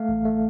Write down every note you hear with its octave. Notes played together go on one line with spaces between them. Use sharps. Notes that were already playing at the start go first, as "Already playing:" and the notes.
Already playing: A3 F5
A1
A3